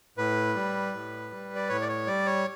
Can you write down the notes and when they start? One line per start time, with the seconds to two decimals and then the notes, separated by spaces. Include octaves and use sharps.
0.18 A2 B4
0.56 G3
0.94 A2
1.31 G3
1.55 D5
1.69 A2 C#5
1.82 D5
1.89 C#5
2.07 G3 D5
2.26 C#5